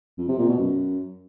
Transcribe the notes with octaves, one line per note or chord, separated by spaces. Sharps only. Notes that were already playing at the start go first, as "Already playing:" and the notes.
F2
C3
A#2
B2
F#2